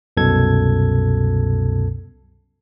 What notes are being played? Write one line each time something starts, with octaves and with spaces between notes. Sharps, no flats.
C2 F#2 B2 A4 G#6